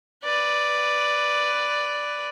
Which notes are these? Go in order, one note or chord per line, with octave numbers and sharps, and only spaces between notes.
B4 D5